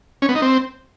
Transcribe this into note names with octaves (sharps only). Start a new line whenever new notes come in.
C#4
B3
D#4
C4